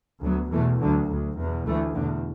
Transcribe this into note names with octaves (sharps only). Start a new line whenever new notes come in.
D2 F#3 B3
E2 B2 E3 A3
D2 D3 F#3
D2
E2 B2
D2 E3 A3
E2 B2 D3